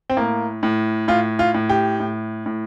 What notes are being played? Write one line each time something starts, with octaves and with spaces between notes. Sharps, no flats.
C4
A2 A#3
A2
A2 F4
F4
A2
G4
A2
A2